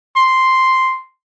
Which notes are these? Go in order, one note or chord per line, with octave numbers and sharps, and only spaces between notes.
C6